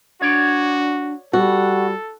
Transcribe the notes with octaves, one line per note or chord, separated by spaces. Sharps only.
D4 F#4 C#5 D5
G3 F#4 A4